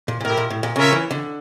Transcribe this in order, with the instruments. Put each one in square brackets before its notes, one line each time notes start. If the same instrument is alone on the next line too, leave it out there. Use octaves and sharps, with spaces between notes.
[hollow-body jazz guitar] A#2
A#2
[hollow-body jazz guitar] A2 [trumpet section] E4 G4 A#4
[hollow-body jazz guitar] A#2
A2
A#2
[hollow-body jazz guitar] C#3 [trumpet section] C#4 F4 A#4 C#5 E5
[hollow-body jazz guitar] E3
D3